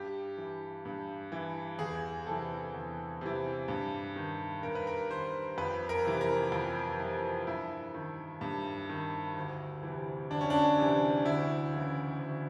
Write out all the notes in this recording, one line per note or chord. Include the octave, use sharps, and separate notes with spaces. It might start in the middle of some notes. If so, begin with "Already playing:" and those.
Already playing: G2 G4
E3
G2
E3
E2 G#4
C3 E3 A4
E2
C3 E3
G2
D#3
G2 A#4
B4
A#4
D#3 C5
F2 B4
A#4
C3 E3
A#4
F2
C3 E3
G2 E4
D#3
G2
D#3
D2
E3
C3
D2 D4
C#4
D4
C3 E3
D2 E4
C#3 E3
D2